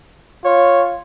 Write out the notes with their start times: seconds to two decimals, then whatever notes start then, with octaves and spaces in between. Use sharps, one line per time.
0.45 F4 C#5